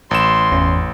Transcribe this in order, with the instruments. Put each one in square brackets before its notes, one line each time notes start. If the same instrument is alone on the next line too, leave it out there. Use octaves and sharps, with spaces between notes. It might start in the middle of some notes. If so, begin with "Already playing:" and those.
[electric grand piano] A1 E7 [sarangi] C6
[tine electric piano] G1 E2 C#4